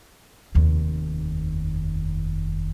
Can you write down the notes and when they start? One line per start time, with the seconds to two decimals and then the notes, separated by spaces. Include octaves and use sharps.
0.55 F1 D#2